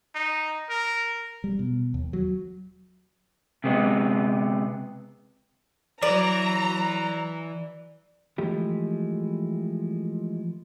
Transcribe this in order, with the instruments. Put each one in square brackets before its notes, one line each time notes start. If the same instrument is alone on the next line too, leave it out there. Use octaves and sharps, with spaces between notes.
[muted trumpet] D#4
A#4
[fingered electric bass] G3
B2
D#2
F#3
[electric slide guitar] C3 G#3 B3
[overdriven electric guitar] E3 [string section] F#3 A#5 [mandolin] D5
[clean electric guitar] E3 F3 G#3 A3 G4